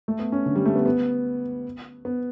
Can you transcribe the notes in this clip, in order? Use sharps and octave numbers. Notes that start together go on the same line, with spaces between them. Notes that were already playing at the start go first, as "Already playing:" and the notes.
A3
B3
C#4
D3
G3
A3
B3
B3
B3